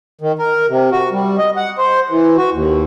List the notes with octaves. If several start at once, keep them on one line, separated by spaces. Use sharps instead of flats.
D#3
A#4
C3
F#4
G3
D#5
F#5
C5
E3
F#4
D#2